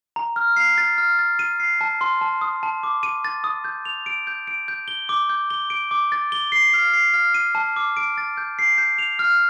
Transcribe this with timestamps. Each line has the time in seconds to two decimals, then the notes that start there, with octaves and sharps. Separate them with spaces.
0.16 A#5
0.36 F6
0.56 C7
0.78 A6
0.98 F6
1.19 A6
1.39 D#7
1.60 C7
1.81 A5
2.01 C6
2.21 A5
2.41 D#6
2.63 A5
2.83 D6
3.03 D#7
3.25 A6
3.44 D#6
3.64 G6
3.85 F7
4.06 D7
4.27 G6
4.47 D7
4.68 G6
4.88 G7
5.09 D6
5.30 G6
5.50 G7
5.70 D7
5.91 D6
6.12 A6
6.32 G7
6.52 C7
6.74 F6
6.94 C7
7.14 F6
7.34 D#7
7.55 A5
7.76 D6
7.97 D7
8.18 A6
8.37 G6
8.59 C7
8.78 G6
8.99 F7
9.19 F6